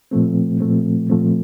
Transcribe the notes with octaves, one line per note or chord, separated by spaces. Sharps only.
A#2 F3 A3 C4
A#2 F3 A3 C4
A#2 F3 A3 C4